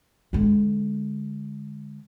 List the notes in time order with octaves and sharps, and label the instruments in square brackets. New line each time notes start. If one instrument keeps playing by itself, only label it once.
[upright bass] D3 G#3